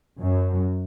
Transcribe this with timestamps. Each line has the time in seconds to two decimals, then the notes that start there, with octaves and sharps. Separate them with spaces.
0.20 F#2